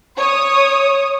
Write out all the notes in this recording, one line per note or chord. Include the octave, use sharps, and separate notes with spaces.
C#5 D#6